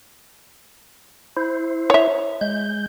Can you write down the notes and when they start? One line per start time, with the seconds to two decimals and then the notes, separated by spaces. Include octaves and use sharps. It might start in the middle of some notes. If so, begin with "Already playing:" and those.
1.37 E4 C5
1.90 C#5 E5
2.41 G#3 G6